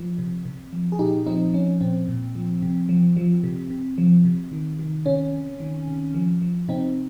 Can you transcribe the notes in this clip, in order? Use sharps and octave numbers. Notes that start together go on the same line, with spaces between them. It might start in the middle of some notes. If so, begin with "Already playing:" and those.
Already playing: F3
C3
C3
F3
G#4
A#2 D#4 G4
F3 C4 D#4
F3 C#4
A#2 C4
A#2
F3
C3
F3
F3
C3
C3
F3
C3
D#3
D#3
C3 C#4
C3
D#3
C3
F3
F3
C3 C4 D#4